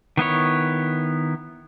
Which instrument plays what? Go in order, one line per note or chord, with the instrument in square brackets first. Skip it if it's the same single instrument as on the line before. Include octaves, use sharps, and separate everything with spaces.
[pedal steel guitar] D#3 B3 E4 C#5